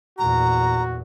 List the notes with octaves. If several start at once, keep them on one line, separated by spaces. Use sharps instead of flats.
E2 A#2 F#4 A#5